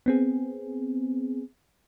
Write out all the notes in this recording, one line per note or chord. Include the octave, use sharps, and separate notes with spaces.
B3 C4 G#4